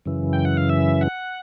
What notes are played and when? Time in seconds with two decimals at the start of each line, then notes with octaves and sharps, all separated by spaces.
0.06 F#2 C#3 E3
0.33 G5
0.45 F#5
0.57 F5
0.69 E5
1.01 F#5